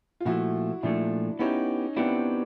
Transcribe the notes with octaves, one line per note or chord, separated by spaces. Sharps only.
F4
A#2 F3 A3 E4 F#4
A#2 F3 A3 D4 E4
B3 C#4 D#4 E4 G4
B3 C4 D4 E4 G4